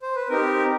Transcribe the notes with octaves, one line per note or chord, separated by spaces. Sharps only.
C5
B4
C4 D#4 G4 A#4